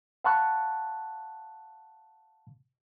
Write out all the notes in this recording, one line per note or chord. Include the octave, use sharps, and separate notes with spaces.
F5 F#5 A5 B5 C#6 F#6